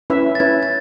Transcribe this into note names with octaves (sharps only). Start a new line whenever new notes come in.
C#4 E4 B4 E5
A6
C#4 E4 B4 G#6
A6